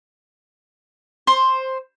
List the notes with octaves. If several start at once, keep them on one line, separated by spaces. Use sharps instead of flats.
C5